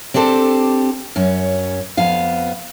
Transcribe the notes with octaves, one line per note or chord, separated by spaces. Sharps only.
C4 D4 G4 A4 C5
F#2 C#4
F2 B3 F5